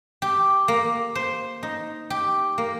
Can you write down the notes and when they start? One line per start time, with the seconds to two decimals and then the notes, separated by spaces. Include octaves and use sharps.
0.22 G4
0.68 A#3
1.15 C5
1.63 D#4
2.10 G4
2.58 A#3